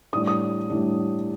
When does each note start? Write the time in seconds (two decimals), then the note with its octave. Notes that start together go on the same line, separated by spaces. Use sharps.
0.13 A2 G3 D4 D#6
0.27 D#6
0.70 A2 G3 D4